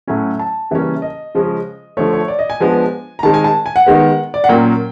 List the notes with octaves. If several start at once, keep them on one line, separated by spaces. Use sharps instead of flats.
A2 F#3 A3 C#4 G#5
A5
C#3 E3 G3 A#3 C#4
D#5
C#3 F3 G#3 C#4
D3 F3 A3 C#5
C#5
D5
D#5
G#5
F3 G#3 B3 D4
A#5
D#3 G#3 C4 A5
G#5
A5
G#5
F#5
D#3 G#3 B3
D5
F#5
A#2 F#3 A#3 C#4 G5